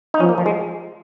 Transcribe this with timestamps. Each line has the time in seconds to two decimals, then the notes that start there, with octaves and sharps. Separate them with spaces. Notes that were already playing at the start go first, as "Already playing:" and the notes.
0.14 D#4
0.20 F3 C#4
0.29 A#3
0.38 F3
0.46 G#3